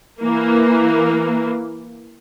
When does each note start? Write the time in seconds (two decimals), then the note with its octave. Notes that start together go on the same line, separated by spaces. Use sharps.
0.20 E3 A#3